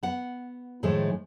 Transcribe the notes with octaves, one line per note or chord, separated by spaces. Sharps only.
B3 F#5
A2 D#3 F3 G#3 A3